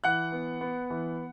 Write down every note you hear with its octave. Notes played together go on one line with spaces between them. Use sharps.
E3 F#5 F#6
B3
B3
E3